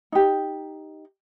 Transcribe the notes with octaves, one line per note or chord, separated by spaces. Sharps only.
D#4 G4